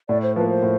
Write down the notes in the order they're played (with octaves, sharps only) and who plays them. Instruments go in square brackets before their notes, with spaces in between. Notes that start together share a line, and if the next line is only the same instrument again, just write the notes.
[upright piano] A2 [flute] D5
[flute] C5
[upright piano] F3 A#3 [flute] B4
[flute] C5
[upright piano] A2